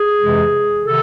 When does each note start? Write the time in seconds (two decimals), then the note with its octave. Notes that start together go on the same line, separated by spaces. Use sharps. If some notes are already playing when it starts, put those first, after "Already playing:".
Already playing: G#4
0.21 F2 C3 E3 G#3
0.84 C3 D#3 A4